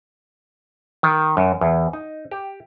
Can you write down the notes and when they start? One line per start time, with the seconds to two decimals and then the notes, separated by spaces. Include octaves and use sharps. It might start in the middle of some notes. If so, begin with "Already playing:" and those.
1.03 D#3
1.37 F#2
1.61 E2
1.93 D#4
2.31 G4